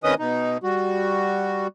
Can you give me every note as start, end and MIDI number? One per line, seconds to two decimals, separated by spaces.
0.04 0.15 48
0.04 0.15 51
0.04 0.15 61
0.04 0.15 71
0.04 0.15 75
0.04 0.15 87
0.19 0.58 47
0.19 0.58 63
0.63 1.67 55
0.63 1.67 66